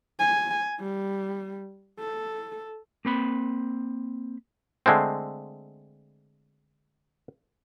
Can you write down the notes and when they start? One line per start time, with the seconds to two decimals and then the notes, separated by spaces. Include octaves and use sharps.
0.19 G#5
0.80 G3
2.00 A4
3.05 A#3 C4 B5
4.86 D3 G#3 A3 C4